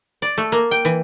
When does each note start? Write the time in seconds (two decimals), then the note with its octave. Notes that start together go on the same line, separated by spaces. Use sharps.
0.22 D5
0.38 A3
0.52 A#3
0.71 G5
0.85 E3